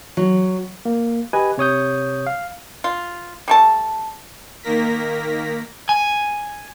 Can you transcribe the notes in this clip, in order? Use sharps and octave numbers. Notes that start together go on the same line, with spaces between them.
F#3
A#3
G4 B4 D#5 G#5
C3 C#5 D#6 G6
F5
F4
G3 A3 A5
D#3 A#3 A#4 A#6 B6
G#5